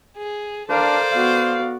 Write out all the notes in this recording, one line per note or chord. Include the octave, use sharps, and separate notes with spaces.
G#4
D4 A4 A#4 C5 D5 F5
B3 F#4 F5